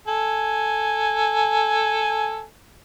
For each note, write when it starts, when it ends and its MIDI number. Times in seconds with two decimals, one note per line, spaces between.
0.07 2.44 69
0.07 2.44 80